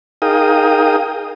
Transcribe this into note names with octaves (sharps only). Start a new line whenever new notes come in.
D#4 G#4 A#4 F5 G5 D#6